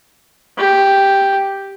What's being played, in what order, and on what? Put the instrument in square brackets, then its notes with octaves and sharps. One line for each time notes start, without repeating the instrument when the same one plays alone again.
[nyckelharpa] G4